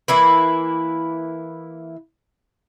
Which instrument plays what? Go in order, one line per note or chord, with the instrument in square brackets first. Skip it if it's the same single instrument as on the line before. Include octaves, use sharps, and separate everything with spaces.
[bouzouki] E3 A#3 E4 B4